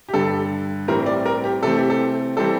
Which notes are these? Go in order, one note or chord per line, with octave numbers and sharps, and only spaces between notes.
G4
G2 D3 G3 A4
A2 E3 G3 C4 A#4
D5
A#4
G4
C3 E3 A3 C4 A4
G4
A4
E3 G3 C4 A4